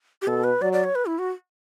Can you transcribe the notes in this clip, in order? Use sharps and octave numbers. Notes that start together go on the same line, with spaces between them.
G4
B2 A4
B4
F#3 D5
D5
C#5
B4
E4
F#4